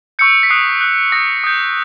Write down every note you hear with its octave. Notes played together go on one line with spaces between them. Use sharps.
C#6 E6 G6 C#7
B6
D#6 F#6 C7
D#6 F#6
D#6 G6 A#6
D#6 G6